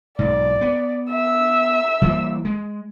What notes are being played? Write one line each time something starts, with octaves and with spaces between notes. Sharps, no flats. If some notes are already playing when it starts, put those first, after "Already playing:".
B1 G#2 D5
B3
E5 E6
E3 G3 A#3
G#3